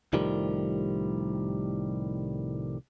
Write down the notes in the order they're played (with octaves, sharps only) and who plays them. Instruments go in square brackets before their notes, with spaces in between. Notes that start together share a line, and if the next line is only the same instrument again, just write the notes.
[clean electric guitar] C2 A2 D#3 F3 G3